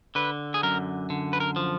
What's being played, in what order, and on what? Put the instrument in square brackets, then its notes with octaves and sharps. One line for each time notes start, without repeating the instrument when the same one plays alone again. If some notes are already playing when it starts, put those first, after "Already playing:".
[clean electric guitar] D3 B4
G#4
F#2 A#4
D3
B4
A#4
F3